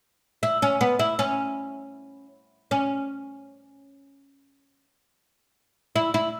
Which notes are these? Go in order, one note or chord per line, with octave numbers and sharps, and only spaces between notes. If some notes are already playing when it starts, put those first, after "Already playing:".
E4
C#4
B3
E4
C#4
C#4
E4
E4